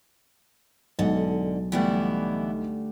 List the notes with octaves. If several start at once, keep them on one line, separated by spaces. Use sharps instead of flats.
B1 G#2 D3 F#5
D3 E3 G3 A3 B3 E4